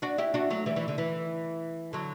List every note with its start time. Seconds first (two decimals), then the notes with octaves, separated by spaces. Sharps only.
0.02 D4 F#4
0.18 E4 G4
0.34 D4 F#4
0.50 F#3 A3
0.66 E3 G3
0.76 E3
0.88 D3
0.98 E3
1.93 D3 F#3